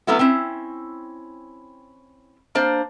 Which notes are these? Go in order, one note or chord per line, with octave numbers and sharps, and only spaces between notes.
F#3 A3 B3 C#4 E4 F#4
C4 C#4 E4
A#3 D4 C5